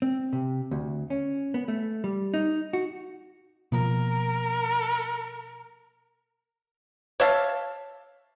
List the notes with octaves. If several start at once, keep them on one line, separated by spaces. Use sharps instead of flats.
C4
C3
D2
C#4
B3
A3
G3
D#4
F#4
B2 F3 A#3 A#4
C#5 E5 F5 A5